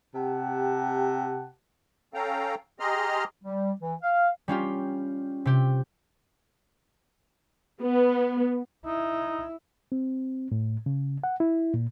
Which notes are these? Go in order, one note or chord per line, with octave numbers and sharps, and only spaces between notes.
C3 G4 F#5 A5
C#4 A4 F5 G5 A#5
G4 G#4 D#5 A#5 C6 F6
G3
E3
F5
G3 C#4 F4 G4
C3 G4
B3
D#4 E4
C4
A2
C#3
F#5
E4
A#2